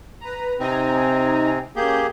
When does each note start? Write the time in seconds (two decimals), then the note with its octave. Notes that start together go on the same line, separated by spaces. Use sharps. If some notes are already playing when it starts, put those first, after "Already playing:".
0.20 B4 A#5
0.60 C3 C4 D#4 G#5 A#5
1.76 A#3 C#4 G4 G#4 G6